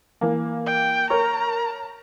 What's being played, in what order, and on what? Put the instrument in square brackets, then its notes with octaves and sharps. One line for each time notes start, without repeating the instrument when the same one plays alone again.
[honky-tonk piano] E3 A#3
[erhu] G5
[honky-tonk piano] A#4 C#5 C#6 [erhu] A#5